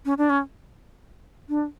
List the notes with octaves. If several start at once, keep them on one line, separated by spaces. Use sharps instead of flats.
C#4
D4
C#4
D4